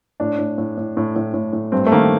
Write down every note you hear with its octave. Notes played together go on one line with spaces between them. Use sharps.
A2 D4
A2
A2
A2
A2
A2
A2
A2
G2 C4
A3
D#3 A#3